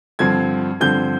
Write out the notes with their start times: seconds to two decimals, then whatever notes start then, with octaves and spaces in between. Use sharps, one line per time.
0.19 G2 D3 F3 C4 G#6
0.80 G2 D3 F3 C4 G6